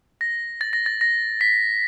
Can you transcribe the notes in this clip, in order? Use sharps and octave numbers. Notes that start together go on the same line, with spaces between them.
A#6
A6
A#6
A6
A#6
B6